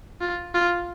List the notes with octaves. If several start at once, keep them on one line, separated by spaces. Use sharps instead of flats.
F4
F4